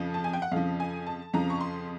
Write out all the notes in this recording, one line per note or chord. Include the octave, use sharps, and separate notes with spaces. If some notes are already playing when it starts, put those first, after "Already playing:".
Already playing: F2 C#3 F3
A5
G#5
G5
F#5
F2 C#3 F3 F5
G#5
A5
F2 C#3 F3 A#5
C#6
C6